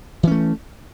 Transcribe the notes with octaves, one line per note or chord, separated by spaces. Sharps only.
E3 A3 C#4